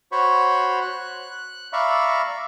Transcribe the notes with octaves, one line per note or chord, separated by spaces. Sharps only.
F#4 C5 C#5 B5 C#6
F#6
D5 E5 F5 A#5 B5 C#6